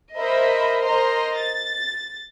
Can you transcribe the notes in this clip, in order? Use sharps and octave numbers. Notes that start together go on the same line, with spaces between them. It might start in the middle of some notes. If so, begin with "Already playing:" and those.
A#4 C5 D#5 E5 B5
A#4 C5 D#5 A#5 C6
A6